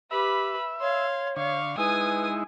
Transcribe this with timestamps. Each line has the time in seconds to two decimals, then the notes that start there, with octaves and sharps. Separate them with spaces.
0.11 G4 B4 E5 B5
0.80 C#5 F5 C6
1.36 D3 F5 C#6
1.78 G#3 D#4 E4 B4 G#5 D#6